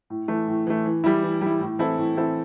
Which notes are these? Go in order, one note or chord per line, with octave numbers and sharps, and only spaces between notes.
A2
E3 A3
A2
E3 A3
E3
G3 E4
E3
G3 E4
A2
E3 C4 E4 A4
A2
E3 C4 E4 A4